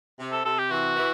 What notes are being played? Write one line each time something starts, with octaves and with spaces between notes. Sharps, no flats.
C3
A4
C3 A4
G4
E3 F#4
E3